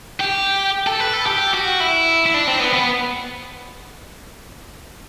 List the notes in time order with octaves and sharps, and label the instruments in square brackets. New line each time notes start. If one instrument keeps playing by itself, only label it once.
[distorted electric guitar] G4
A4
B4
A4
G4
F#4
E4
E4
D4
C4
B3
B3